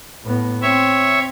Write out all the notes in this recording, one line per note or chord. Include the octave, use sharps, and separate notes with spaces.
A2 B3
C4 C#5 E5